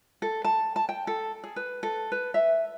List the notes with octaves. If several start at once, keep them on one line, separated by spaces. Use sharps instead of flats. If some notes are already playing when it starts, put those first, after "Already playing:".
A4
A5
A5
G5
A4
G#4
B4
A4
B4
E5